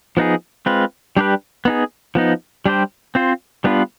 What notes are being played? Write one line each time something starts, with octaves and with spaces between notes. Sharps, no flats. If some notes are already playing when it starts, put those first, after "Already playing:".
F3 B3 D#4 G#4
G#3 C4 F4 B4
G3 D4 G4 B4
B3 D#4 G#4
F3 B3 D#4
G3 D4 G4 C5
C4 F4 C5
G3 B3 D4 F4 B4